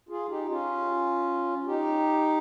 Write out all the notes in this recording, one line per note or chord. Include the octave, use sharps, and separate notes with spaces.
F4 G#4
D#4 G4
C#4 F4
D#4 G4